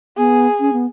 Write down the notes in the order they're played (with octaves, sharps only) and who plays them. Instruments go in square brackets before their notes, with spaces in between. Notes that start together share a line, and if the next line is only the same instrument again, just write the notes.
[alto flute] B3 [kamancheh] G#4
[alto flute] C#4
B3